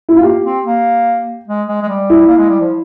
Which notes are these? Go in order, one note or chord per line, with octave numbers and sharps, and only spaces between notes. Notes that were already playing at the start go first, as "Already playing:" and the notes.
E4
F4
A#3 G4
C4
A#3
G#3
G#3
G#3
G3
E4
A#3
G#3
G3
F3